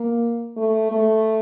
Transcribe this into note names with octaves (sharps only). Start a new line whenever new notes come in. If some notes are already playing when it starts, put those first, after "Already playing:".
Already playing: A#3
A3
A3